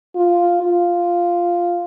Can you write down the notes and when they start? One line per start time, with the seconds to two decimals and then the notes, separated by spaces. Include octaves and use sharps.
0.16 F4
0.62 F4